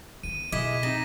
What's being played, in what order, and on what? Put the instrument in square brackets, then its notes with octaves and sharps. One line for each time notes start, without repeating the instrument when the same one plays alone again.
[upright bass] B3 [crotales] D#7
[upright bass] B2 [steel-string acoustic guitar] G#3 [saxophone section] E4 D#5 [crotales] D6 G#6 B6
[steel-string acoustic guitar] C3 [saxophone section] D#4 [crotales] A#6